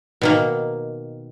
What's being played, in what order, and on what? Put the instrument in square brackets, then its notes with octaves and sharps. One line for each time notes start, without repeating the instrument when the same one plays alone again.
[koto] B2 D#3 A#3